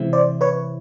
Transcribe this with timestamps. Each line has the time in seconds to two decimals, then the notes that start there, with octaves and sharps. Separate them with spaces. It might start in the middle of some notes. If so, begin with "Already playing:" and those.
Already playing: C3 E3 G#3 C4 E4
0.13 C5 D5
0.41 B4 C#5